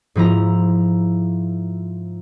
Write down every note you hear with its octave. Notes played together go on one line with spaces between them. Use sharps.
G#2 F3 E4 A#5